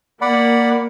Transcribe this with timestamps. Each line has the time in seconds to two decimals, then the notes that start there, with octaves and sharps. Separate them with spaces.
0.21 A#3 D5 F#5 B5